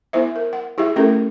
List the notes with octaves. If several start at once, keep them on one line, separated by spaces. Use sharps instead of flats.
B3 E4 C5 E5
A#4
F#5
E4 G4 G#4 E5
A3 C#4 E4 G4 A4 A#4